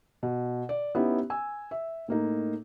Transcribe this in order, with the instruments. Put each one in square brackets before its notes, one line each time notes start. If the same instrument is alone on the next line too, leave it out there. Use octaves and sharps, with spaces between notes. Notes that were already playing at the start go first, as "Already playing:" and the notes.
[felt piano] B2
D5
B3 C#4 D#4 E4 G4
G#5 E6
E5
A2 A#3 D#4